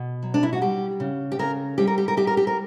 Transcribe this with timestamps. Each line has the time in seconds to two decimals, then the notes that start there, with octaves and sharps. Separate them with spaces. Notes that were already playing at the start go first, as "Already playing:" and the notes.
Already playing: B2
0.23 F#3
0.34 D4
0.43 E4
0.53 F#4
0.61 G3 G4
1.00 C#3
1.32 G4
1.39 C#3 A#4
1.78 G3 G4
1.87 A#4
1.98 G4
2.08 A#4
2.17 G3 G4
2.27 A#4
2.37 G4
2.47 A#4